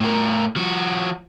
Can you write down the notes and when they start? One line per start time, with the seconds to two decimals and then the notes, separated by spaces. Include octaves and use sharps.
0.01 A2 A#4
0.56 F3 F#4